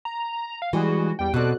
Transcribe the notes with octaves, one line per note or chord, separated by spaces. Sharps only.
A#5
F5
E3 G3 G#3 F#4 G#4
E2 G3 G5
B2 C4 F#4 A4 D5 F#6